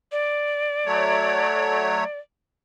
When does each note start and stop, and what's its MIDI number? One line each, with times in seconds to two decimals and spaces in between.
0.12 2.18 74
0.86 2.04 54
0.86 2.04 57
0.86 2.04 73